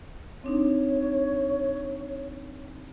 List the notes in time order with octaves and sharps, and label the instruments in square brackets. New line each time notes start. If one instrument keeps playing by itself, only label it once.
[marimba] C4 D4 D#4 [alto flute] C#5